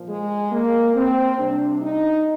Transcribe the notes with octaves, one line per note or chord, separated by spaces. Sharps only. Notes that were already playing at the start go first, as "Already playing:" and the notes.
Already playing: A#2 F3
G#3
A#3
C4
C3 G3 D4
D#4